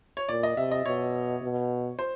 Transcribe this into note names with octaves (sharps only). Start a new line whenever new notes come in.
C#5
A#2 D5
D#5
C3 E5
D#5
B2 C#5
B2
C5